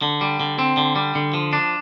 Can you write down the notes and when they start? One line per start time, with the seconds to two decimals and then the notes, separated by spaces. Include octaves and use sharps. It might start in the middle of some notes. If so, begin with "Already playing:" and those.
0.02 D3
0.21 G3
0.40 D3
0.59 C4
0.77 D3
0.96 G3
1.15 D3
1.34 F3
1.53 D4